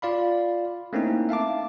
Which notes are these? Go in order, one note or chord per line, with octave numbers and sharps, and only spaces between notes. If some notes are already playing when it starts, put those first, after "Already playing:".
F4 D5 F5 B5
A3 A#3 C4 C#4 D#4 E4
E5 F5 A5 D6